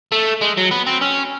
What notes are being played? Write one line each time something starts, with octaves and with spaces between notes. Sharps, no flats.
A3
G#3
F#3
B3
C4
C#4